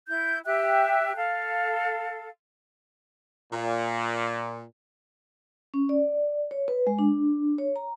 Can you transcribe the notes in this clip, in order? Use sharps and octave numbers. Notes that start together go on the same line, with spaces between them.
E4 G6
G4 E5 G5 F#6
A4 F5
A#2
C#4
D5
C#5
B4
G#3
D4
C#5
A#5